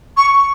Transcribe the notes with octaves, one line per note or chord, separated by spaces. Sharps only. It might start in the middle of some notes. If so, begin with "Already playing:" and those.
C#6